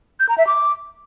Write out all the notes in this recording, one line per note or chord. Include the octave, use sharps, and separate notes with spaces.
G6
A#5
E5
D6